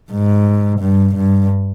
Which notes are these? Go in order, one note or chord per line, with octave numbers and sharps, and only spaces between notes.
G#2
G2
G2